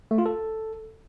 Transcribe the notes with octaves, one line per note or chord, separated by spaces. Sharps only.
A3
F4
A4